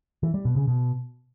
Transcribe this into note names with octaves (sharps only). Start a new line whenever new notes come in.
E3
G3
B2
C#3
B2